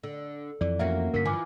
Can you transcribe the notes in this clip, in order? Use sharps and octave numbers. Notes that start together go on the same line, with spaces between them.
D3
F2 E3 D5
A#3 C#4 F#4 E5
G2 D3 A#4 B6
E3 F3 G#5 D6